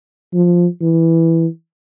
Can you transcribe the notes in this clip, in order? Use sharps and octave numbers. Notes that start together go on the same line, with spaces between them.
F3
E3